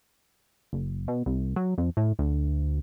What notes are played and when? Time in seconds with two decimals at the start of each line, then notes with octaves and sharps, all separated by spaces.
0.73 F#1
1.08 B2
1.26 C2
1.56 F#3
1.78 F2
1.97 A2
2.19 D2